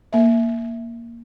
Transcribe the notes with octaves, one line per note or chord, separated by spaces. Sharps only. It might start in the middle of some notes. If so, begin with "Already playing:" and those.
A#3 E5